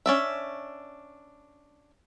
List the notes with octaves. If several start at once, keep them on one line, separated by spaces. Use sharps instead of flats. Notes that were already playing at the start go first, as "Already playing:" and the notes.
C#4 D4 E5